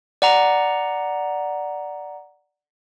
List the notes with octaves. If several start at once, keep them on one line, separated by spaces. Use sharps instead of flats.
D5 F#5 A#5